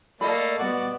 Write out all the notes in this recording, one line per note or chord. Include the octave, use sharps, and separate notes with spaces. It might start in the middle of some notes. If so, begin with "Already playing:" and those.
A3 A#3 A4 D5 D#5 B5
G3 B3 F#4 D5 F#5